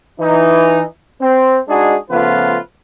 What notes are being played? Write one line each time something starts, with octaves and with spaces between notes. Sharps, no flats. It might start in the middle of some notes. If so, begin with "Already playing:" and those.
E3 D#4
C4
G#3 D4 D#4 F#4 G#4
C#3 F3 A3 B3 F4 B4